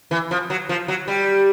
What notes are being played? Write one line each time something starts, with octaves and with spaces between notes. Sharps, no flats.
E3
F3
F#3
F3
F#3
G3